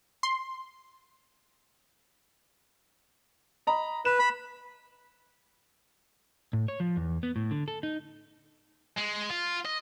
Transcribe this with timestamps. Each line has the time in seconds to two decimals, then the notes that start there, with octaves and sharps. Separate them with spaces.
0.23 C6
3.67 D#5 A#5 B5
4.05 B4 E7
4.19 B5
6.53 A2
6.68 C#5
6.80 F3
6.97 E2
7.23 B3
7.36 A2
7.51 D3
7.68 A4
7.83 D#4
8.98 G#3
9.30 F4
9.65 D#5